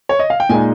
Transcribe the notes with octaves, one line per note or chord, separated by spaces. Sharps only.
C#5
D#5
F5
G5
A#2 G#3 D#4 G#5